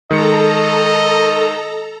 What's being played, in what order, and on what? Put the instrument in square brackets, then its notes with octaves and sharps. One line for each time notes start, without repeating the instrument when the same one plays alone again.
[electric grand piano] D#3 G#3 C#7 [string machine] A4 A#5 [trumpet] D#5